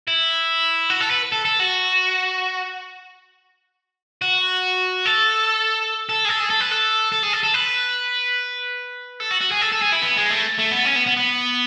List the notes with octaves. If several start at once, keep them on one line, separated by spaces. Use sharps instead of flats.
E4
F#4
A4
B4
A4
A4
F#4
F#4
A4
A4
G#4
A4
G#4
A4
B4
A4
A4
G#4
A4
A4
B4
A4
F#4
F#4
G#4
A4
A4
G#4
E4
B3
G#3
A3
A3
B3
C#4
B3
B3
B3